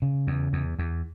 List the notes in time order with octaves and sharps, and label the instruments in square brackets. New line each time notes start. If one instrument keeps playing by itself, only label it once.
[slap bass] C#3
E2
E2
E2